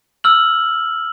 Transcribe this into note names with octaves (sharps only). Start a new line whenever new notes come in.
E6 F6 F#7